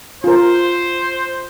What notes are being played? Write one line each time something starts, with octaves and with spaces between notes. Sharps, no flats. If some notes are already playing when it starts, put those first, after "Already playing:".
F4 A#4 C5